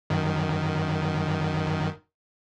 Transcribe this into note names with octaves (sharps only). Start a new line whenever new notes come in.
F#2 D#3